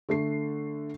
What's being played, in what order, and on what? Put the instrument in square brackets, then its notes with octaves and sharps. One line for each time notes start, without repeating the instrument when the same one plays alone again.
[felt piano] D3 A3 C7